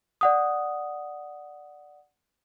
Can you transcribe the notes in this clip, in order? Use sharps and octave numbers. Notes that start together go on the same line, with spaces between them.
D5 F#5 D#6